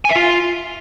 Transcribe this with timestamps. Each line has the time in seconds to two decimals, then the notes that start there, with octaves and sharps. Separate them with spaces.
0.05 G#5
0.10 E5
0.16 F4